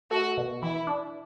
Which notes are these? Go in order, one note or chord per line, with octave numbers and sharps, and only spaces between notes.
A3 F#4
B2
E3 E4
D4